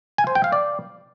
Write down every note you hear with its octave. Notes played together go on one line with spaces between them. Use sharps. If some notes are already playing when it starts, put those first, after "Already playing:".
G#5
C5
G5
F5
D5